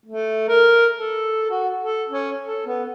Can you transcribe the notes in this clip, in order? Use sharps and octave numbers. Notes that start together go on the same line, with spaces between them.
A3
A#4
A4
F#4
A4
C#4
A4
B3